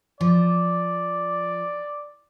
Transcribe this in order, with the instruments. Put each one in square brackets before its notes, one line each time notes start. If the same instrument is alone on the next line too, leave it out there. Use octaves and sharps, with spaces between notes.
[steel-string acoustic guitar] F3 [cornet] D5